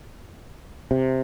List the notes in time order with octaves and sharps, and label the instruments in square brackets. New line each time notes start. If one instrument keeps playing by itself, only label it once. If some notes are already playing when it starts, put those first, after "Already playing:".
[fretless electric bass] C3